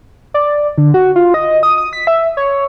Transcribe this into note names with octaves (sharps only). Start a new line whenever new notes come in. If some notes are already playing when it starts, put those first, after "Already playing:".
D5
D3
F#4
F4
D#5
D#6
D#6
B6
E5
C#5